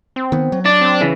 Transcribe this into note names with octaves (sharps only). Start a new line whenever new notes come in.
C4
D#3 B3
F#3
D4 D5
C4
C#3 E3